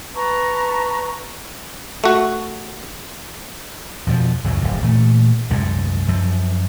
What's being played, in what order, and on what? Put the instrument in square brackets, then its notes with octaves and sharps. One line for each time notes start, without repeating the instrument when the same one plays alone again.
[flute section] B4 A5 A#5 C#6
[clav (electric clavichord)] A3 F#4
[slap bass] F2 B2 F3
C#2 F#2 A2 F#3
F1 A2 D3
A#2 E3 A3
C2 F#2 A2 G#3
F#2 F3